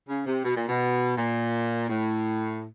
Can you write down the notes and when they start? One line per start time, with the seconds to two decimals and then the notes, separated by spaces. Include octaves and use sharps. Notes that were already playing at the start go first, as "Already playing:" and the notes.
0.08 C#3
0.26 C3
0.45 B2
0.56 A#2
0.69 B2
1.17 A#2
1.89 A2